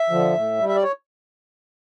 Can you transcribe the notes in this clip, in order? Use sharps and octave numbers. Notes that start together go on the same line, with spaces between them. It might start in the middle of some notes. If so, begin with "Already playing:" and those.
Already playing: E5
D3 F3
A2
G3
E5
D5
C#5